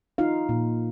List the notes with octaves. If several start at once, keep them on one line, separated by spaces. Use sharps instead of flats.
D#4 F4 F5
A#2